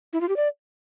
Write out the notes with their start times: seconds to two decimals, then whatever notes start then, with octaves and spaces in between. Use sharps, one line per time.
0.13 E4
0.21 F4
0.29 G4
0.36 D5